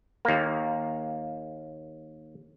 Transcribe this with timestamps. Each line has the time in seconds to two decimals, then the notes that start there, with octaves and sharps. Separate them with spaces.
0.25 D#2 A#3